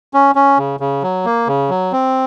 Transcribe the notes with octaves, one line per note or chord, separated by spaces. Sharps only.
C#4
C#4
C#3
C#3
F#3
A#3
C#3
F#3
C4